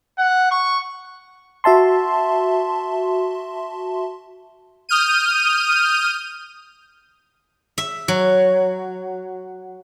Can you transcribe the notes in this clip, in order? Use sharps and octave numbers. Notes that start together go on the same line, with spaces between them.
F#5
C#6
F#4 E5 A5 C6
D#6 F6 G6 D#7
E5
F#3